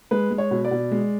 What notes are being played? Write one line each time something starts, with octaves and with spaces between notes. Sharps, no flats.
G#3 B4
G#3
C#5
B2
D5
B2
G#3